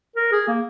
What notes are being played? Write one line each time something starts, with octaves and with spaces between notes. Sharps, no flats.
A#4
G#4
A#3